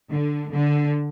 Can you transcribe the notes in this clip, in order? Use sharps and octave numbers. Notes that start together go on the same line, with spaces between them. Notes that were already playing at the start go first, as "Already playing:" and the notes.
D3
D3